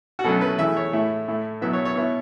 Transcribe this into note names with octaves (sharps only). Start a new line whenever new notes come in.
F#4
B2 F#3 A3 C#4 A4
B4
E2 E3 A3 E4 E5
C#5
A2 A3 E4
A2 A3 E4
B2 F#3 B3 E4 E5
C#5
C#5
B2 B3 E4 C#5